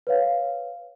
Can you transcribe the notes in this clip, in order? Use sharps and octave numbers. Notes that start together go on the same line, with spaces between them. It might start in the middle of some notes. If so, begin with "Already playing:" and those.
B4 C#5 F5